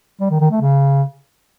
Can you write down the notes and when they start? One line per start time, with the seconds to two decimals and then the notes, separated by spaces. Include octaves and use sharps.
0.20 G3
0.31 D#3
0.41 D#3
0.51 A3
0.61 C#3